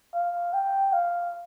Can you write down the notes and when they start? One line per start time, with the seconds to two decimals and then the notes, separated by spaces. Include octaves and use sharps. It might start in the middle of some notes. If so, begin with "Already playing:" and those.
0.14 F5
0.54 G5
0.93 F5